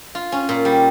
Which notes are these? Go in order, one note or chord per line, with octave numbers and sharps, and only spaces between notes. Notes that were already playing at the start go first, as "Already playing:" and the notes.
F4
C#4
A#2
G3